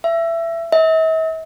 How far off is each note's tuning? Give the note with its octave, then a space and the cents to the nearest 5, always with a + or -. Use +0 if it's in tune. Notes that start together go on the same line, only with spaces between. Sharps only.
E5 +20
E5 -45